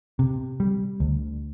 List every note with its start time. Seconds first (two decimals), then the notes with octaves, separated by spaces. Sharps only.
0.19 C3
0.60 G3
1.00 D2